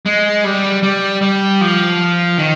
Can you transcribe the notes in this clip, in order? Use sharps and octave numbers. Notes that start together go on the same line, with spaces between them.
G#3
G3
G3
G3
F3
D#3